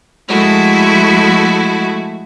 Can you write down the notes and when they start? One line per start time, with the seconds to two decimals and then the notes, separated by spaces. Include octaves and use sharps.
0.28 F3 G#3 A3 E4 F#4